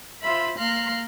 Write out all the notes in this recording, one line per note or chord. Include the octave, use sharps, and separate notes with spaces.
F4 C5 E5 B5
A#3 F5 A#5 C6 F#6